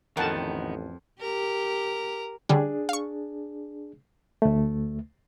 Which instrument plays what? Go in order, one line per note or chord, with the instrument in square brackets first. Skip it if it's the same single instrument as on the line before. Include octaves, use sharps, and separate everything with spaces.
[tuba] A1 [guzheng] F2 [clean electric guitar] D#3 B3 [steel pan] A#4 F#5 A5
[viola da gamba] G4 [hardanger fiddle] A#4
[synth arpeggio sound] D3 G3 C#4 [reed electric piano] D4 G#4
[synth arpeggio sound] F5 C#6
[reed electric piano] D2 A3